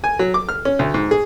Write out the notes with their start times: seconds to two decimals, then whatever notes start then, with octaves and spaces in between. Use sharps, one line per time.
0.04 G#5
0.19 F#3
0.34 D6
0.49 F6
0.65 C#4
0.79 D2
0.94 G#2
1.11 G#4